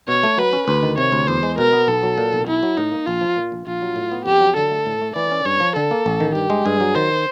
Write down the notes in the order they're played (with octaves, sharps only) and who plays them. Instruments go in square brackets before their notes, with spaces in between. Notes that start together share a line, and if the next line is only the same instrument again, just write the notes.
[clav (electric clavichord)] B2 [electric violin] C#5
[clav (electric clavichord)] A3
[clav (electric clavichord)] F#3 [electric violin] B4
[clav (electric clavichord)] C#4
[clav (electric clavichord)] D2 [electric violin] B4
[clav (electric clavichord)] D#3
[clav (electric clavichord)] C3 [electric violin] C#5
[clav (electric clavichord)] D2
[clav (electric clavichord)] E2 [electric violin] C5
[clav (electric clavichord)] G#3
[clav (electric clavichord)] B2 [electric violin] A#4
[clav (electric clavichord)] B3
[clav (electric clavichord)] B1 [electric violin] A4
[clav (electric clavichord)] F#3
A#2
B1
[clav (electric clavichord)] B1 [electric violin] E4
[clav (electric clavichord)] F#3
[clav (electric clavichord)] A2 [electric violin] D#4
[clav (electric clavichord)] A#3
[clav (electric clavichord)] A#1 [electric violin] F4
[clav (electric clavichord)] F3
A#2
A#1
[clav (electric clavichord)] A#1 [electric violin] F4
[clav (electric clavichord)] F#3
A2
B3
[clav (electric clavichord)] F2 [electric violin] G4
[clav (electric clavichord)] F#3
[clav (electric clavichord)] D3 [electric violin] A4
[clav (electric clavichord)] A3
A2
A3
[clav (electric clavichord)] E3 [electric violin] D5
[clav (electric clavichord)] C#4
[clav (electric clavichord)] G2 [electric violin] C#5
[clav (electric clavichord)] F3
[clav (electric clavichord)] D3 [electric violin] A4
[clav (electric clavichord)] A#3
A1
D#3
[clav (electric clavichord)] G2 [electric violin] G4
[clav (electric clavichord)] G#3
[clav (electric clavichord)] G2 [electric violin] G#4
[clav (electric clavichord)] F#3
[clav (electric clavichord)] D#3 [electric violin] C5